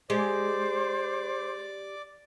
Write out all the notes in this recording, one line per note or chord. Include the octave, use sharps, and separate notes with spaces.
G#3 G4 C5 D5 D6